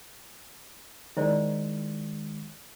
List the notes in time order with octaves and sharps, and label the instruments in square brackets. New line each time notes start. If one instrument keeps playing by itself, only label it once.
[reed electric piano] D#3 G#3 [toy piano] E4 C5 D5